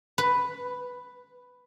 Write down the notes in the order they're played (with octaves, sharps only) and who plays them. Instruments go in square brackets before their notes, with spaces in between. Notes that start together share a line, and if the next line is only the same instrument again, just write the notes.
[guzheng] B4